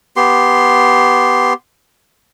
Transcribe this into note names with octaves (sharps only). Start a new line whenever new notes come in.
B3 G4 C6